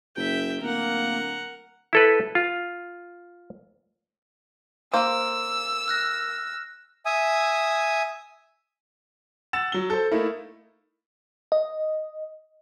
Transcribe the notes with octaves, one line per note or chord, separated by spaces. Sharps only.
F#1 E5 G5
D1 A#3 A#4 F#5
E4 A4 B4
F4
A#3 F4 C5 E6
F6 F#6 A#6
E5 G#5 D#6
F#5 E6 A6 E7
F#3 G7
A4 C5
A3 A#3 D#4 E4
D#5